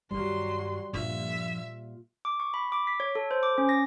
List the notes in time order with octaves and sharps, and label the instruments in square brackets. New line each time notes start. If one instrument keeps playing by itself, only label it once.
[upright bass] G2 D#3 [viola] F#3 C6 [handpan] G3
[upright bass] G2 F3 [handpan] A#2 F4 [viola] E5
[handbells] D6
C#6
B5
D6
B6
C#5
A4
C5
D6
C#4
A#6